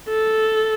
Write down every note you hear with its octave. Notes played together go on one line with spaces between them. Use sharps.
A4